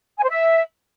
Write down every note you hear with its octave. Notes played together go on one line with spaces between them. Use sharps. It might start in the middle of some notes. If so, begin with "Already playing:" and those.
G#5
C5
E5